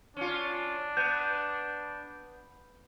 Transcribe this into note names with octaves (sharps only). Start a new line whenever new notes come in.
C#4 D4 F4
B3 G6